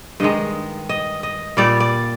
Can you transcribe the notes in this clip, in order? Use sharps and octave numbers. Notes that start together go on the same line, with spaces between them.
G2 D#3 G#3 D#5
D#5
D#5
A#2 G3 D5
D5